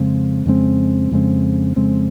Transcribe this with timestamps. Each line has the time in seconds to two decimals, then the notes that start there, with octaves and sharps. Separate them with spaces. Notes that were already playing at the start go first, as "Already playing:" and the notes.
Already playing: F2 C#3 G#3 C4
0.46 F2 C#3 G#3 C4
1.11 F2 C#3 G#3 C4
1.76 F2 C#3 G#3 C4